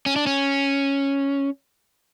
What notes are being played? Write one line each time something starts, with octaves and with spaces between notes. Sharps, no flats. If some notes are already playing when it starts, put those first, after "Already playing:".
C#4
D4
C#4